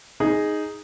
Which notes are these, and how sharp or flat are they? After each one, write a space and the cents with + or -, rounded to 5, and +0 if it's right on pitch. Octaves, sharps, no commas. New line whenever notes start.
D#4 +0 G#4 +0